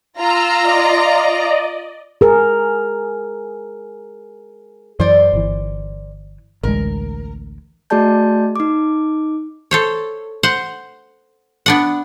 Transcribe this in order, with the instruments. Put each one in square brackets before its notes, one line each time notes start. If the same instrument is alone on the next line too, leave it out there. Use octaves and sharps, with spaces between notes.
[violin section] F4 A#5 [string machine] E6 F6
[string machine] D5 D#5
[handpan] G#4 A#4
[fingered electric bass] F#2 E3 [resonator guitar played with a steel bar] C5 D5
[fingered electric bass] G1 E3
[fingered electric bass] A1 D2 G#3 [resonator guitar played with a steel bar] A#4
[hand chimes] A3 F#4 G#4 D5 A5 G6
D#4 D6
[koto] A4 C5 C#5
C5 F#5
B3 D4 F#5